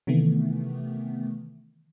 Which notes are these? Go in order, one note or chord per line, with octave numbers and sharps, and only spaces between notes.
C3 D#3 E3 A3 B3